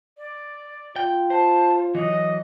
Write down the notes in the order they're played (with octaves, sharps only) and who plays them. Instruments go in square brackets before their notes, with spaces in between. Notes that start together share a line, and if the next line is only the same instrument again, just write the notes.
[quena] D5
[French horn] F4 [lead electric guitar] G5
[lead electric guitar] C5 [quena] A5
[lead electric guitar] E3 F#3 [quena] D#5